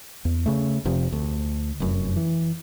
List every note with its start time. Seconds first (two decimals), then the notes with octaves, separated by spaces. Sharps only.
0.25 E2
0.46 C#3 A3
0.85 F1 C3 F3
1.12 D2
1.80 F1 F#2
2.16 E3